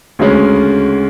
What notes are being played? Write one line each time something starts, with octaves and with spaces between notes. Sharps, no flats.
D2 C#3 G#3 C#4